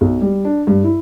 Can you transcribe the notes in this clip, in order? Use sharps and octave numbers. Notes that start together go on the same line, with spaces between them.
B1
G3
D4
G2
E4